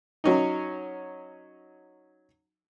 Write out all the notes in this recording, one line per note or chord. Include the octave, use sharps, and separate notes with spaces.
F#3 C#4 D#4